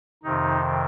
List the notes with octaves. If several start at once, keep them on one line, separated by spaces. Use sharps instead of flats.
F2 C3 D#3 D#4